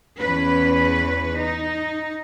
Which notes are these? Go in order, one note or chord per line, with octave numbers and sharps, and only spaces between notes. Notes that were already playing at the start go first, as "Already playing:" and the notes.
E2 C#4 B4
D#4